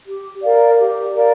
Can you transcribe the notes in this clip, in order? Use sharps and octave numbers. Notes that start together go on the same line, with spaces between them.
G4
A#4 D5 F5
G4
A#4 D5 F5